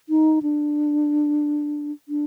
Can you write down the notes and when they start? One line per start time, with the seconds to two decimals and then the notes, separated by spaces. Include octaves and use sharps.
0.09 D#4
0.42 D4
2.08 D4